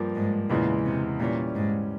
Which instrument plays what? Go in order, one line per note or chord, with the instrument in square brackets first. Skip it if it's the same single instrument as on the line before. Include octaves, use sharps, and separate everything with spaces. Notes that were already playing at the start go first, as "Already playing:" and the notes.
Already playing: [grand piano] G2 F3 A#3
[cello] G#2
[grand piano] E2 C#3 E3 G#3 [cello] A#2
[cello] C3
[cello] A#2 [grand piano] E3 G3 C#4
[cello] G#2